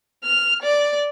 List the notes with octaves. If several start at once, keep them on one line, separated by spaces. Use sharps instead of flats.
F6
D5